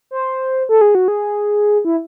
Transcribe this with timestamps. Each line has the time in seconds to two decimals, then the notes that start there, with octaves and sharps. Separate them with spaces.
0.11 C5
0.69 A4
0.81 G#4
0.95 F#4
1.08 G#4
1.85 E4